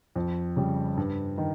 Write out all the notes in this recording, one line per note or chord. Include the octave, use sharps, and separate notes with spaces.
F2
C#3 G3
G2
D#3